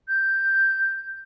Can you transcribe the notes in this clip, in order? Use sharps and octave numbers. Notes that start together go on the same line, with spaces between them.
G6